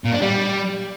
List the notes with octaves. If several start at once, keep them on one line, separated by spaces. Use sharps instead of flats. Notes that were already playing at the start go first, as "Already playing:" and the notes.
A#2
D4
G3